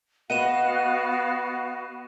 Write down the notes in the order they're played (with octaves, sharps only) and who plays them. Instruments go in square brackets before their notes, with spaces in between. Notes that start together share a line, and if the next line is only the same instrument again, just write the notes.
[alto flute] B3 [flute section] F#4 F5 [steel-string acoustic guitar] B4 D#5 F#5 [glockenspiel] D#7 E7